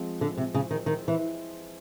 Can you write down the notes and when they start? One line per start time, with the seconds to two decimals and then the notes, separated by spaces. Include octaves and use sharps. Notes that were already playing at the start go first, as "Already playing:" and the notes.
Already playing: F3 G#3 C4
0.21 D3
0.37 C3
0.54 C#3
0.71 D#3
0.86 D#3
1.08 E3